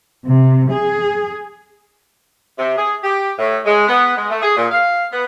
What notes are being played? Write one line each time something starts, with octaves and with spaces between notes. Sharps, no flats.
C3
G#4
C3
G#4
G4
A2
G#3
B3
G#3
A3
G#4
A#2
F5
B3